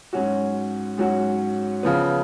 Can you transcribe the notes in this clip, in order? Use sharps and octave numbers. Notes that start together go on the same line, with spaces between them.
G#2 F#3 C#4 F#4
G#2 F#3 C#4 F#4
C#3 F3 B3